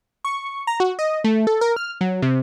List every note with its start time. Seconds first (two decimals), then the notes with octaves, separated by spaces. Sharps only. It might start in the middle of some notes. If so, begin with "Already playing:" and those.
0.25 C#6
0.67 A#5
0.80 F#4
0.99 D#5
1.24 A3
1.47 A4
1.61 A#4
1.76 F6
2.01 F#3
2.22 C3